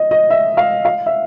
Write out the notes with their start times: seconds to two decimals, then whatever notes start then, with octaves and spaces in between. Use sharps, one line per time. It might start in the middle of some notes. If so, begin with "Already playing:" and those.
Already playing: D#5
0.11 D#5
0.30 E5
0.57 F5
0.85 F5
1.06 E5